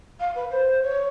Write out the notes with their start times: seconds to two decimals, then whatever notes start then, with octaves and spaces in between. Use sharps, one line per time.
0.20 F5
0.35 B4
0.51 C5
0.83 C#5